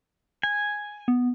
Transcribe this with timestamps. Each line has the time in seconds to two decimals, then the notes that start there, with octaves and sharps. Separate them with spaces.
0.43 G#5
1.08 B3